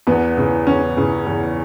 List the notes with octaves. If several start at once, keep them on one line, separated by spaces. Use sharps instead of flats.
E2 B3
C#3 E3
E2 C#4
C#3 E3
E2